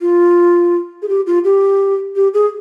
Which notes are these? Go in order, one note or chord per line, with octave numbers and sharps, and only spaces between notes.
F4
G#4
G4
F4
G4
G4
G#4